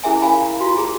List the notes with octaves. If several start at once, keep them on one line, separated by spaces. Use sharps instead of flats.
C#4 E4 G#4 A#4 E5 G#5
E4 A#4 F5 G#5 B5
A#5
F4 F#4
G#4 A#5